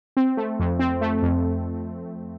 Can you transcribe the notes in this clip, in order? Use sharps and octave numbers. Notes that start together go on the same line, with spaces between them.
C4
A3
F2
C4
A3
F2